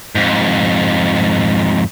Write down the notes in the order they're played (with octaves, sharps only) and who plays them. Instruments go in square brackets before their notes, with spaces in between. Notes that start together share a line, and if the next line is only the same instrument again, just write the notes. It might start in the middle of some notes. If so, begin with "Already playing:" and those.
[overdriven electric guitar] F2 G#2